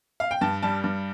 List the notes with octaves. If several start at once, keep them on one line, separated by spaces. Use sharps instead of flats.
F5
G5
G2 A5
G3 A5
G2